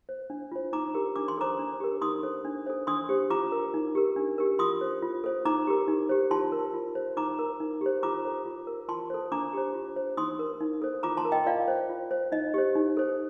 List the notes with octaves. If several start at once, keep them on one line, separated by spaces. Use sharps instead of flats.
C5
D4
F4 C5
D#4 A#5 D6
G4 A#4
D4 D6
C6
A4 C5 A#5 D6
D4
G4 A#4
D#4 C6 D#6
A4 C5
D4
A4 C5
D4 C6 D#6
G4 C5
F4 A#5 D6
A#4
D#4
G4 A#4
D4
G4 A#4
F4 C6 D#6
C5
F4
A4 C5
D#4 A#5 D6
G4 A#4
D#4
G4 C5
F4 A5 C6
A#4
F4
C5
D#4 A#5 D6
A#4
D#4
G4 C5
F4 A#5 D6
A4 C5
F4
A#4
F4 A5 C6
A4 C5
D4 A#5 D6
G4 C5
F4
C5
D#4 C6 D#6
A#4
D#4
A4 C5
F4 A#5 D6
A5 C6
A#4
D#5 G5
F4 D5 F5
C5
F4
C5
D#4 D#5
G4 C5
D#4
A4 C5